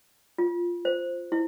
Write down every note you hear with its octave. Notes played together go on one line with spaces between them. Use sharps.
F4
C5
E4